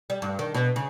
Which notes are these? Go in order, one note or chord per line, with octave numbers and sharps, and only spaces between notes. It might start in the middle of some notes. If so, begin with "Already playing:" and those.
G3
G2
D#3
B2
C#3